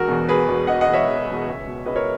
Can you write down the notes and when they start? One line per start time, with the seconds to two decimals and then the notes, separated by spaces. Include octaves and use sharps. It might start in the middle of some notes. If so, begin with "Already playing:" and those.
Already playing: E1 F#4 A#4
0.08 E2 B2
0.28 E1 G#4 B4
0.48 E2 B2
0.67 E1 D#5 F#5
0.81 D#5 F#5
0.88 E2 B2
0.93 C#5 E5
1.07 E1
1.26 E2 B2
1.46 C#2
1.67 B2
1.86 C#2 B4 D#5
1.96 A#4 C#5